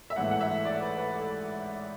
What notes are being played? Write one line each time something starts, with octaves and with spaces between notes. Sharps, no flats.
E5
A1 G#2 E3 A3 F#5
F#5
E5
D5
B4
B4
A4